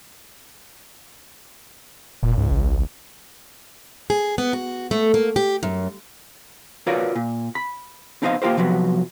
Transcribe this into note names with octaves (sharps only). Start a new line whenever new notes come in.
F1 A#2
C#2 G#2
A1
G#4
B3
F#4
A3
A#3
G4
F#2
F4 F#4 A#4 B4 C#5 D5
A#2
B5
B3 C4 D#4 C5 D#5 F5
A#3 F4 G4 A#4 C5
C3 F3 F#3 B3